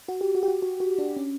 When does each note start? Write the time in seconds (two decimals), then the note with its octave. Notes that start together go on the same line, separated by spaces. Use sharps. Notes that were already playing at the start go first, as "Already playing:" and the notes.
0.08 F#4
0.21 G4
0.35 F#4
0.43 G4
0.48 F#4
0.62 F#4
0.80 F#4
0.98 D4
1.16 C#4